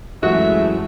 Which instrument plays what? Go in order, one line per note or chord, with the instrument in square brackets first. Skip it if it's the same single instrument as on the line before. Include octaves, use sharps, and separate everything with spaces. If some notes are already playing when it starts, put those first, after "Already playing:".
[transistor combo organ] F#2 E3 [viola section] G#3 A3 [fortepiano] F#4 [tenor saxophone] E5